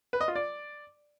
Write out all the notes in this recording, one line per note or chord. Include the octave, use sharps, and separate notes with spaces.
B4
D#5
F4
D5